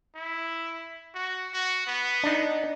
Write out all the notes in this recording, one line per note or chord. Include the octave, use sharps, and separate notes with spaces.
E4
F#4
F#4
B3
D4 D#4